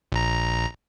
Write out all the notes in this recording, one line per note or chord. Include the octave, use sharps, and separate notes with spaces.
A#1 A#5